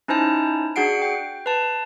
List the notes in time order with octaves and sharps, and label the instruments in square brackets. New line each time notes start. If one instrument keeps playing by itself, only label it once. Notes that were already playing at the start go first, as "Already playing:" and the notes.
[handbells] C#4 D#4 E4 C5 G#5 A5
D4 F#4 G#4 F#5 C7 D7
G5
B4 A5